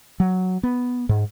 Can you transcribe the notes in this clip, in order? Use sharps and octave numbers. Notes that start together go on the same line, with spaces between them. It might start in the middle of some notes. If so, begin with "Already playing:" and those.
F#3
B3
G#2